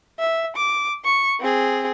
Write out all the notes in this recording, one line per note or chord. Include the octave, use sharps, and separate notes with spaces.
E5
D6
C#6
C4 G#4